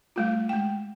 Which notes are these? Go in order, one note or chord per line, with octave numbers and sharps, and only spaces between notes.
G3 A3 F4
G#3 G5